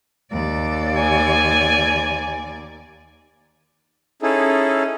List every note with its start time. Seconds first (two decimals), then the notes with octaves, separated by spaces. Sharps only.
0.31 D#2 D5
0.99 G#5
4.22 C#4 D#4 E4 G#4 A4